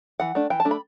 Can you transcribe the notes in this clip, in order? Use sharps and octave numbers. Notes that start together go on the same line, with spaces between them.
E3 F#5
A3 D4
E3 G5
A5
A3 D4
B5